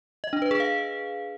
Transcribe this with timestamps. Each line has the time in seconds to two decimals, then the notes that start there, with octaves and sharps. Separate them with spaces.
0.24 D#5
0.33 D4
0.42 B4
0.51 G#4
0.60 F5